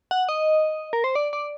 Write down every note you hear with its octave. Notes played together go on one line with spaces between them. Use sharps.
F#5
D#5
A#4
C5
D5
D5